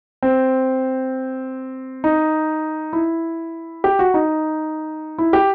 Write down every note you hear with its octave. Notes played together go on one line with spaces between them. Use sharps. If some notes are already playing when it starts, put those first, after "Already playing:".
C4
D#4
E4
G4
F#4
D#4
E4
G4